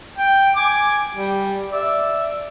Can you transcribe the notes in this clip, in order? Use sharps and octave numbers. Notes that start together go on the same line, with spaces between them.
G5
G#5 D6
G3
D5 E5